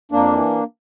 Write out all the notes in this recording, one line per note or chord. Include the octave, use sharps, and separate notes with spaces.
F2 A#3 D4
E3